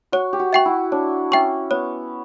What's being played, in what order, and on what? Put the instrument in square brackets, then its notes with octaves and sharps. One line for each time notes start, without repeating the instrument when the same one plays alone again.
[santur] F#4 [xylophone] C#5
[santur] G4
F#4
[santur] F#4 [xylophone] E5 G5 C#6
[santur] E4
[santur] D4 [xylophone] C#5
[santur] C#4 [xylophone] E5 G5 C#6
[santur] B3 [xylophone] C#5